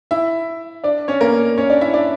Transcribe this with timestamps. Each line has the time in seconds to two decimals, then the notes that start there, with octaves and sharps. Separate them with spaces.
0.11 E4 E5
0.84 D4 D5
1.08 C#4 C#5
1.21 A#3 A#4
1.58 C#4 C#5
1.70 D4 D5
1.81 E4 E5
1.94 D4 D5